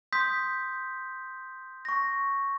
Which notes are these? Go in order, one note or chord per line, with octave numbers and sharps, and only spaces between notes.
C6 D#6 G6 B6
C#6 A#6